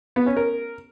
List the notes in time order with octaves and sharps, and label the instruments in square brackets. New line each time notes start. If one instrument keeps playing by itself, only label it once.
[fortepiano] B3
C#4
A#4